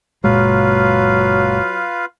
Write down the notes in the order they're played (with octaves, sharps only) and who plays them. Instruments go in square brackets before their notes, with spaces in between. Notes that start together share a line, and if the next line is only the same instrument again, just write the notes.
[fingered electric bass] F#1 A#2 G#3 [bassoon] F#3 [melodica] F4 B4 F5